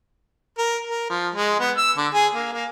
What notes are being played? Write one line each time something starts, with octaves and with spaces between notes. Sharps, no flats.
A#4
A#4
F3
G#3
B3
E6
D3
G#4
A#3
A#3